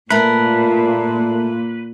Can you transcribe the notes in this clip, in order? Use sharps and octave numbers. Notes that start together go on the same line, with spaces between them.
A#2 A3 A#4 B4